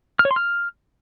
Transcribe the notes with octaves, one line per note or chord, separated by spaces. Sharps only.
F6
C#5
C6
F6